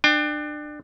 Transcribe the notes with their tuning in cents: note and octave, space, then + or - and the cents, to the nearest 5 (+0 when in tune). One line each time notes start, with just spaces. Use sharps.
D4 +25 G5 +30